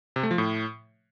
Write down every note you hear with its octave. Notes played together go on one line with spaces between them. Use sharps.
C3
A3
F3
A2